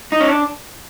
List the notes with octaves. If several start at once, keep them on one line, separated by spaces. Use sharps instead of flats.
D#4
C#4
D4